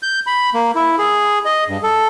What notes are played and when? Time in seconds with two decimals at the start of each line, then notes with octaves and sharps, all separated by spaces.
0.03 G6
0.27 B5
0.54 A#3
0.75 E4
0.99 G#4
1.46 D#5
1.68 G2
1.83 A4